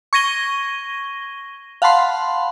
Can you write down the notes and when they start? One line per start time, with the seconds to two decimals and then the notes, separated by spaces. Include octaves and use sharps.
0.13 C#6 G#6 A#6 D#7 G7
1.82 F5 F#5 A5 B5 C6